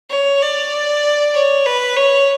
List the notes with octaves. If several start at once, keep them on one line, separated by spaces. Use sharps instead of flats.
C#5
D5
C#5
B4
C#5